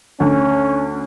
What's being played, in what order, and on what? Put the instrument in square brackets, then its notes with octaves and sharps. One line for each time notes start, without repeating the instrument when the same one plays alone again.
[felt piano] D2 [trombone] C#4